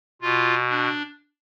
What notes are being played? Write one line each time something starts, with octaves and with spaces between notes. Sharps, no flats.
B2 F4
D4